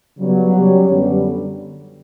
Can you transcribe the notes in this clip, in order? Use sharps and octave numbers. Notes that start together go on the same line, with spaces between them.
C#3 F#3 G3 B3
G3 C#4 G4 C#5
F#2 D3 G3 B3